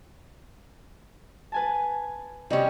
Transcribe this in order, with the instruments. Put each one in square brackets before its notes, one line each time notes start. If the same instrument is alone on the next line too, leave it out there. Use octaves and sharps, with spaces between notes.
[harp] B4 G#5 A5
[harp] C3 G4 [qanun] G3 C#4 [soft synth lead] D#5